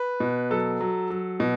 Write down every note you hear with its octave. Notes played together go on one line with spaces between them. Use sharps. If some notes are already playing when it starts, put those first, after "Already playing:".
Already playing: B4
B2
F#3 A4
F#3
F#3
B2